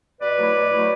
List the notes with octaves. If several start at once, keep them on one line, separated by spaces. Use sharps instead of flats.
B2 B4 D5
F#3 A3 E4
B2
F#3 A3 E4